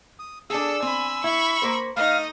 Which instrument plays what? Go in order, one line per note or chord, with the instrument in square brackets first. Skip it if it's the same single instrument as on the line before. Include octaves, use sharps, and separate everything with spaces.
[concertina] D#6
[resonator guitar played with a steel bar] D4 G#4 [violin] A4 [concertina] E6
[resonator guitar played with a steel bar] C4 [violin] G#5 B5
[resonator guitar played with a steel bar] E4 [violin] B5 C#6
[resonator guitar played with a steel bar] A#3 A#4 C5
[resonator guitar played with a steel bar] A3 [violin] D#4 D#5 [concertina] F5